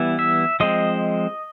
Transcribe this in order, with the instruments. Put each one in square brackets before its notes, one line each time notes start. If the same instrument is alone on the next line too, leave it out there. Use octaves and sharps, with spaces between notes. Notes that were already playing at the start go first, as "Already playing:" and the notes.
Already playing: [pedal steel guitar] E3 G3 B3 E4
E5
F3 G#3 C4 D#5